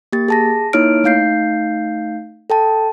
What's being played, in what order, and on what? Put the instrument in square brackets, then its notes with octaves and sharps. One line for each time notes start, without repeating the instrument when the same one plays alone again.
[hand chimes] A#3 G4 A6
G#4 A5 A#6
A#3 D#4 E4 C#5 F6 D7
A3 D#4 F5 G6 C7
A4 G5 A5